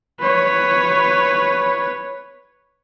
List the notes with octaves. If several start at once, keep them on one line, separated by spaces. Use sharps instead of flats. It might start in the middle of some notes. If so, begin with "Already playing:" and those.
B4 C#5